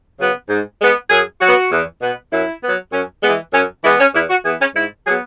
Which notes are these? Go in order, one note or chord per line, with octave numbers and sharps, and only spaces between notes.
C#3 F#3 B3
G#2
G#3 B3
F#2 G#4
F#3 B3 F#4
E2
B2 B3
F#2 E4
F#3 B3
F#2 C#4
E3 G#3 B3
F#2 C#4
E3 G#3 B3 E4
C#4
E2 E4
F#4
E3 B3 G#4
C#4
G#2 E4
F#3 B3 G#4